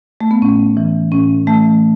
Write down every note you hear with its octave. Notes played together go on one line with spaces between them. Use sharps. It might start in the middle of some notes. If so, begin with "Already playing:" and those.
A3
B3
A2 C#4
E3
A2 C#4
E3 A3